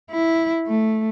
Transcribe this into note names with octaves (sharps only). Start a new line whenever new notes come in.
E4
A3